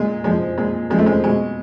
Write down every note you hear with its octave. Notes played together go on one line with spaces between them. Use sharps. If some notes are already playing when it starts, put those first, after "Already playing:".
Already playing: A#2 G#3
F3 G#3
A#2 G#3
F3 G#3
A3
G#3
B2 G#3